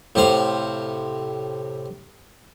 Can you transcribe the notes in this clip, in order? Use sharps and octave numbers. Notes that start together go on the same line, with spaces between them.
A2 C3 C5 F5